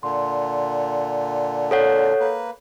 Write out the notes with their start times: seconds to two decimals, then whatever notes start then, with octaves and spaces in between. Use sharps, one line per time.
0.03 A#2 D3 C6
1.71 A4 C#5 F#5
2.20 A#3 B4